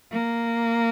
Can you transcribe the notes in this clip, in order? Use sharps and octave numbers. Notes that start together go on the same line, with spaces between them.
A#3